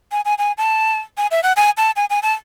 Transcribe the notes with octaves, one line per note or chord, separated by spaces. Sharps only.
G#5
G#5
G#5
A5
G#5
E5
F#5
G#5
A5
G#5
G#5
A5